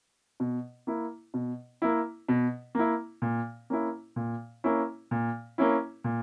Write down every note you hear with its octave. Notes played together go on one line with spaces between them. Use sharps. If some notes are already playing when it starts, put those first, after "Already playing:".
B2
A#3 E4
B2
A#3 E4
B2
A#3 E4
A#2
A#3 C#4 E4
A#2
A#3 C#4 E4
A#2
A#3 C#4 E4
A#2